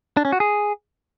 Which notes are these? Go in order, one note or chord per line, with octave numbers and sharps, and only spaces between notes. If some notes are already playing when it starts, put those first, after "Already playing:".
D4
C#4
F#4
G#4